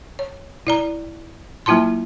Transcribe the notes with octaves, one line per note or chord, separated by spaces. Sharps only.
C#5
E4 D5 A#5
F#3 A#3 E4 F4 A5 C6